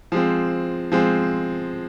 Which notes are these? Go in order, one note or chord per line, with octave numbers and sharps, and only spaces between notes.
F3 G#3 C4
F3 G#3 C4